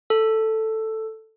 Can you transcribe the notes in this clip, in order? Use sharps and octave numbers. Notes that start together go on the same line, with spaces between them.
A4